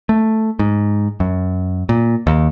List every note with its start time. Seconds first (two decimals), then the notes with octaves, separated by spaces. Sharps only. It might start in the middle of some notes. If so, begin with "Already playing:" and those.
0.09 A3
0.59 G#2
1.20 F#2
1.89 A#2
2.27 D#2